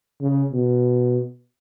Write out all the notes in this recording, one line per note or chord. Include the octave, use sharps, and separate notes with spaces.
C#3
B2